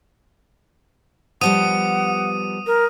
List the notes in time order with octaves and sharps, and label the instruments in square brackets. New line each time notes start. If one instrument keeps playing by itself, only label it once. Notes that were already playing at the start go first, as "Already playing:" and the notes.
[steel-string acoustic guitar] F3 G3 B3 [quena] F#5 [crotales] D#6 D#7
[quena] A#4